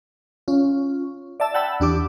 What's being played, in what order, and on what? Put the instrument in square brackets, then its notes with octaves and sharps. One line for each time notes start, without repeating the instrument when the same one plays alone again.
[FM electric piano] C#4 F4
D5 E5 A5 E6
F#5 G5 A5 B5 E6
E2 D4 G4 D6